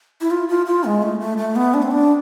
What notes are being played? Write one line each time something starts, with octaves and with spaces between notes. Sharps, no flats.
E4
F4
F4
F4
G#3
A3
A3
A3
B3
D4
C4
D4